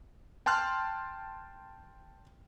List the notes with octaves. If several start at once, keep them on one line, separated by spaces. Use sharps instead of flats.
G5 A5 C6 F6 F#6